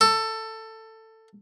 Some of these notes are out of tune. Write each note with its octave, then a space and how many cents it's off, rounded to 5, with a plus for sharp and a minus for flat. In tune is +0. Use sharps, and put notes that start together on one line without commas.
A4 +15